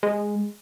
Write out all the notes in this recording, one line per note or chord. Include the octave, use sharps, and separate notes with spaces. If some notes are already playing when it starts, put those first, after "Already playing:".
G#3